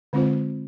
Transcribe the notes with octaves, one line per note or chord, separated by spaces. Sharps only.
D3 G#3 C4 F4 C5